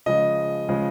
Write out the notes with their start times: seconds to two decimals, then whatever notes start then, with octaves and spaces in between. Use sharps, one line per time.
0.06 C#3 F3 G#3 D#5
0.69 C#3 F3 G#3